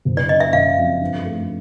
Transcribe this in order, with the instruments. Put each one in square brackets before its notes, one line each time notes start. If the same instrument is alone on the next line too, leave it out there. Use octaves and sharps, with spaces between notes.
[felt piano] F#1
[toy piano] D5
[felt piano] C#3 [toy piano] D#5
[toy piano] E5
[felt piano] F#1 [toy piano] F5
[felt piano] F2
G2
A3